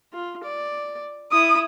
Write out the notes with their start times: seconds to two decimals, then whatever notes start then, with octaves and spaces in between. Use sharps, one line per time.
0.13 F4
0.44 D5
1.32 E4 D#6